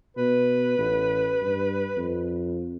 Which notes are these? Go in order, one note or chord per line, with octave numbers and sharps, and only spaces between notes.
B2 B4
A1
G2
F2